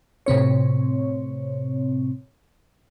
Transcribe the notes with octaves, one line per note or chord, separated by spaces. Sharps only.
A2 C3 C4 C#5